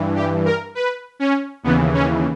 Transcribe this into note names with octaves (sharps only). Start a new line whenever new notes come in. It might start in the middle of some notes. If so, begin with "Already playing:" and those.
Already playing: G2 E3
G4
A#4
B4
C#4
D#2 C#3 E3 B3
C#4